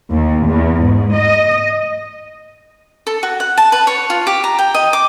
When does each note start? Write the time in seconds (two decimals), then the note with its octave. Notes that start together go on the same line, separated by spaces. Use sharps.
0.11 D#2
0.47 E2
0.82 G#2
1.14 D#5
3.07 A4
3.23 F#4
3.40 F#5
3.58 A5
3.72 B4
3.87 C#5
4.10 F4
4.27 G4
4.44 A#5
4.59 G5
4.74 D#5
4.93 D6